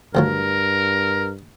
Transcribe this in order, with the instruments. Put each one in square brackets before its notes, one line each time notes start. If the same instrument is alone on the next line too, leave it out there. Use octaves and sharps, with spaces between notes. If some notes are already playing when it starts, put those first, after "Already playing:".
[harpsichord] D2 F3 F#3 [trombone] G2 [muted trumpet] A#4